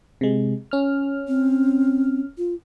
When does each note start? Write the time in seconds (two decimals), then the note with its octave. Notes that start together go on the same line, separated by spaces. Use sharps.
0.21 C3 G#3
0.71 C#4 F6
1.28 C4
2.38 F4